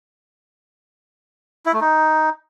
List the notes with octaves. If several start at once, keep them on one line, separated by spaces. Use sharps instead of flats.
E4
A3
D#4